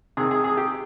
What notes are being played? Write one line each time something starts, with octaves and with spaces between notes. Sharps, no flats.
C3 D#3 G#4
G#4
G#4
G4